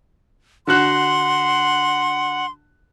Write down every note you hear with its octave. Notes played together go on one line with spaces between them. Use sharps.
D3 F#4 F#5 C6 F#6